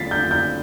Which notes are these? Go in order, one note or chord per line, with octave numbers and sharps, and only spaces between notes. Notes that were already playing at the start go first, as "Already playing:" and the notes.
Already playing: A6 B6 C7
G6
G6